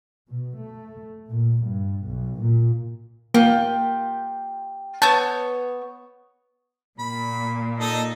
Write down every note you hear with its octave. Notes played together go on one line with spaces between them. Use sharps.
B2
A3
A#2
G2
B1
A#2
A#3 F4 G4 G5
B3 C#5 A5 G6
A#2 B5
D#4 A4 D#5